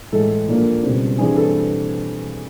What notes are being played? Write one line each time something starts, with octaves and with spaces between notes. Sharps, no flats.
A2 E3 G#3 A4
A#2 F3 A#3 D4
C#2 B2 G3 C4
G2 E3 G3 C4 G#4
A4